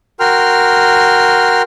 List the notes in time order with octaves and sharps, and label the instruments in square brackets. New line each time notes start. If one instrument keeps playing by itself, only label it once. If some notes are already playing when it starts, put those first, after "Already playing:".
[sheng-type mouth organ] F#4 A#4 G5 C6 F6